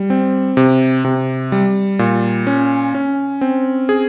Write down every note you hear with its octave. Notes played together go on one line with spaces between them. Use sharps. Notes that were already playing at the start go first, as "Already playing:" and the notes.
Already playing: G3
C4
C3
C3
G3
A#2
C#4
C#4
C4
G#4